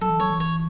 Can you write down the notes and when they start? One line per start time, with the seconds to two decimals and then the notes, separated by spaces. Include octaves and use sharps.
0.01 F#3 A4
0.10 E3
0.20 F#3 C#5
0.30 E3
0.40 C#5